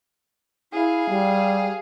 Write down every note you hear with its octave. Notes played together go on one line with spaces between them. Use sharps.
E4 G#4 F5
G3